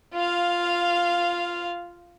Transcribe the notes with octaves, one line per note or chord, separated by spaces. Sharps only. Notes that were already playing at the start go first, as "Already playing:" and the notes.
F4 F5